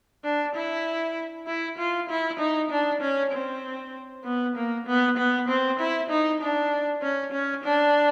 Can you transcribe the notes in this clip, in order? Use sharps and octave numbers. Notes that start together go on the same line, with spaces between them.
D4
E4
E4
F4
E4
D#4
D4
C#4
C4
B3
A#3
B3
B3
C4
E4
D#4
D4
C#4
C#4
D4